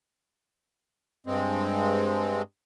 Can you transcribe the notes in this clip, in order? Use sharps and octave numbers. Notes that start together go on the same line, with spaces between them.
G2 G#3 C4